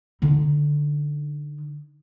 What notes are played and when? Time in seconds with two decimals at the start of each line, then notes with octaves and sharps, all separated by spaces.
0.22 D3 D#4